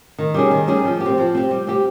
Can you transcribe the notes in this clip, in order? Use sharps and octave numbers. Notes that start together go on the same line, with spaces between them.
D#3
G3 C#4 G#4
D#3
G3 C#4 G#4
F3
G4
C4
F3
C4 G4
G3
C4 G4